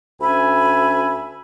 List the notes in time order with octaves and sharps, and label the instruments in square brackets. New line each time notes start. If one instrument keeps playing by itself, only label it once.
[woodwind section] D2 C#4 E5 G#5 B5